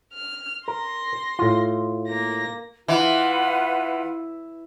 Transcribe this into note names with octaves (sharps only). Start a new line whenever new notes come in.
F6
A#4 C6 A#6
A2 F4
A#3 A#6
E3 F4 B4 F#5